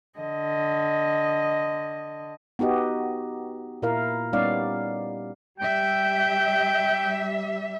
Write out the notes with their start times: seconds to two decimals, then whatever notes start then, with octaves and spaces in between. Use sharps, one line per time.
0.19 D3 D#5
2.59 B3 D#4 F#4 G4 D#5
3.82 A#2 E4 A#4 F5
4.33 G3 B3 C#4 D#4 D5 F5
5.60 G3 G4 E5 G5